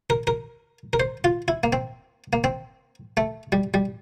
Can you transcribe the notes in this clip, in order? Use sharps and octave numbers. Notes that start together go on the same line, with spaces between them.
A#4
A#4
A#4
C5
F4
E4
A#3
C4
A#3
C4
A3
G3
G3